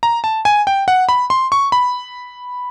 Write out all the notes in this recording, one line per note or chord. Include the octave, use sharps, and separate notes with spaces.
A#5
A5
G#5
G5
F#5
B5
C6
C#6
B5